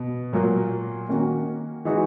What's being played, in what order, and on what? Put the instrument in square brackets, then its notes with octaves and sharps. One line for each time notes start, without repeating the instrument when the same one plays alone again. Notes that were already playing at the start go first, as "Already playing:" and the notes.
Already playing: [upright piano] B2
A#2 F#3 A#3
D#3 A#3 C#4 F#4
E3 G#3 D#4 F#4